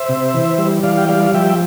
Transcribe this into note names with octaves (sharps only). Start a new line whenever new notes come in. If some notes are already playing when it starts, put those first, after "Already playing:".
Already playing: C5 E5
C3
E3
G3
E3 D5 F5
G5
G3 D5 F5
F3 E5 G5